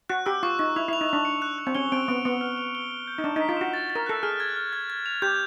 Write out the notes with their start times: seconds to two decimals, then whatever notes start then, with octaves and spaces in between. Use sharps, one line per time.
0.09 F#4 F#6
0.26 G4 E6
0.43 F4 C#6
0.59 D#4 C#6
0.76 E4 F7
0.88 E4 F7
1.01 D#4
1.09 D4 F7
1.25 C#7
1.42 F#6
1.58 F#6
1.67 C4
1.75 C#4 G7
1.92 C4 D7
2.08 B3 D7
2.25 B3 C#7
2.41 F6
2.57 F7
2.75 G7
2.91 G7
3.08 G6
3.18 D#4
3.24 D4 E7
3.36 D#4 B6
3.49 F4
3.57 F#4 E7
3.74 A6
3.90 A6
3.96 A#4
4.06 A4 F#6
4.23 G#4 F6
4.40 G#6
4.56 F6
4.73 G#6
4.90 G#6
5.06 F7
5.22 G4 G6